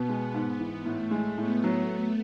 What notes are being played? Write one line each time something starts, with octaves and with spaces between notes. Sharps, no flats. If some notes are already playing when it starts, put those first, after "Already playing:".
Already playing: B2 B3
G#3
G#2
E3
A2 A3
G#3
A2 B3
F#3